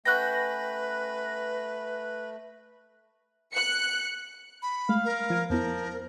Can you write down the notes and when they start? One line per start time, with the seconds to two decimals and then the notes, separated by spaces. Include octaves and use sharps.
0.05 A3 C#4 F#4 B4 G5 F#6 A#6
3.53 F#6 C#7
4.62 B5
4.89 G#3 A3 F5
5.05 A#4
5.30 F3 G#6 D7
5.50 F2 F3 B3 E4 A#4